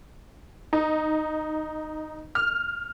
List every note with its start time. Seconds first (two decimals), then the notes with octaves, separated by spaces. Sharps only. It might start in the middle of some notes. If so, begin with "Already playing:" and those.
0.73 D#4
2.35 F6